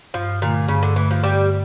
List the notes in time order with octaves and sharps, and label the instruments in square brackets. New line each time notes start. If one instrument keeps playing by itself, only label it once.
[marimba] G2 [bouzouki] F3
[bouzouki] A#2 [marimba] D3 A3
[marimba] G2 [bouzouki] C#3
[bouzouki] D3
[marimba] D3 A3 [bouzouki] E3
[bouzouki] F3
[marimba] G2 [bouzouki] G3